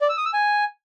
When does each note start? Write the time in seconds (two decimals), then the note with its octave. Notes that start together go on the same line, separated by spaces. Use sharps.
0.01 D5
0.09 E6
0.17 D#6
0.25 E6
0.33 G#5